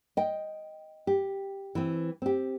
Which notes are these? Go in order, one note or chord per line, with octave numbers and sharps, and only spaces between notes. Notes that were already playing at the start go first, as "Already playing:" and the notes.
D#5 G5
G4
E3 C4
C4 G4